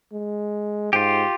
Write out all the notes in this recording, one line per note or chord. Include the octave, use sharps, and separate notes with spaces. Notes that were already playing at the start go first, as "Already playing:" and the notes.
G#3
G#2 F4 G4